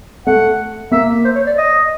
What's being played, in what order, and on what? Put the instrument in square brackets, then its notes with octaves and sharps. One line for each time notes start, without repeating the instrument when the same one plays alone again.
[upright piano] A3 [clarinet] F#5
[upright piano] A#3 [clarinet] E5
[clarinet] C5
C#5
D5
D#5